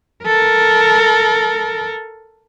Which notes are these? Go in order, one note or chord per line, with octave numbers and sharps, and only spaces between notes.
A4 A#4